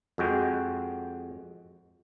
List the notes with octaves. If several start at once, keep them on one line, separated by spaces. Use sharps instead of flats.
F2 G#3 F#4 G5